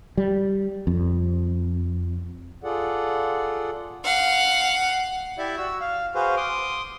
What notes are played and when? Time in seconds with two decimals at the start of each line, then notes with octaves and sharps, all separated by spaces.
0.17 G3
0.87 F2
2.64 F4 G#4 A4 D5 F#5
4.04 F5 F#5
5.38 E4 G4 D5 E5
5.57 F#4 E6
5.81 F5
6.15 F#4 G#4 B4 C5 F5
6.37 C6 D6 D#6